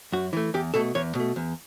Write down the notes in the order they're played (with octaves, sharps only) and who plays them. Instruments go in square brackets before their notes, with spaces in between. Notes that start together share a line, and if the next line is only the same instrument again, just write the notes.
[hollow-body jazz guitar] F#2 F#4
E3 A3
E2 G4
B2 A3 A4
E2 C#5
B2 A3
E2